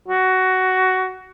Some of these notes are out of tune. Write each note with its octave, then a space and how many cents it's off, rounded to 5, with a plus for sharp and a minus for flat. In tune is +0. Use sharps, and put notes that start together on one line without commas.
F#4 +15